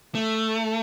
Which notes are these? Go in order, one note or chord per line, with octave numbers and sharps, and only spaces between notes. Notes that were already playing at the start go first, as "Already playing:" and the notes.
A3